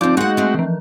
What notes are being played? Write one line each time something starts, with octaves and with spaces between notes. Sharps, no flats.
D2 F3 C4 D#4 D5 G6
G#3 A#3 F#4 F#5
A3 C4
E3 F3